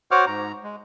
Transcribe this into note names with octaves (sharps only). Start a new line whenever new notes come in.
F#4 C5 C#5 F#5 D6 F6
G#2 A#5
G#3